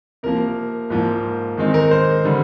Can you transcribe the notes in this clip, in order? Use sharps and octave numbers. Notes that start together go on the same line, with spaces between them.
C3 F3 A#3 A#4
G#2 F3 A#3
D#3 G#3 C4 D#4
A#4
C5
D3 G3